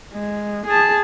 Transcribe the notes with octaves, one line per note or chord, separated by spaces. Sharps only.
G#3
G#4 A5